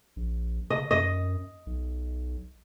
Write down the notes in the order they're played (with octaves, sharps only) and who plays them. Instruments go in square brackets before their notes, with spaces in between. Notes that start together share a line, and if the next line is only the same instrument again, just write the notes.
[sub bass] A#1
[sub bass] C#3 [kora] D#5
[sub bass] F#2 [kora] D#5
[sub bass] B1